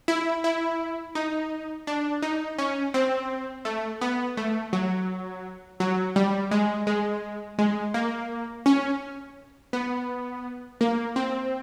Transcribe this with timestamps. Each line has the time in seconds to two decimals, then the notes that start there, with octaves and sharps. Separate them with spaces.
0.08 E4
0.44 E4
1.15 D#4
1.87 D4
2.22 D#4
2.58 C#4
2.94 C4
3.65 A3
4.01 B3
4.37 A3
4.73 F#3
5.80 F#3
6.16 G3
6.51 G#3
6.87 G#3
7.59 G#3
7.94 A#3
8.66 C#4
9.73 B3
10.81 A#3
11.16 C4